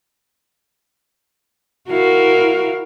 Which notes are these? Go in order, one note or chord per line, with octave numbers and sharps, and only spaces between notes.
E4 F#4 A#4 F5